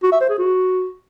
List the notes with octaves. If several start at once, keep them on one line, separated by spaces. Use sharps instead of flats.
F#4
E5
C5
G#4
F#4